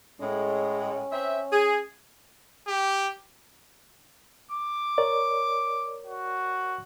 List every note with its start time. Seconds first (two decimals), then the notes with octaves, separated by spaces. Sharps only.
0.21 A2 G#3 C#4
1.13 C4 E5
1.53 G#4
2.67 G4
4.51 D6
4.98 A#4 C#5 D5
6.06 F#4